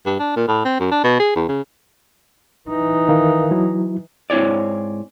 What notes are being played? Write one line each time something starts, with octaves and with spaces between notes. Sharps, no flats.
G2
D4
A#2
A2
C4
F#2
D4
B2
G#4
E2
C#3
E3 D#4
D#3 A#4 F5
F#3 E4
G#2 C4 E4 C#5 D5